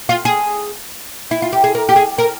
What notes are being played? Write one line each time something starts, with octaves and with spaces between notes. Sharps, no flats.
F4
G#4
E4
F4
G4
G#4
A#4
G4
G#4
A#4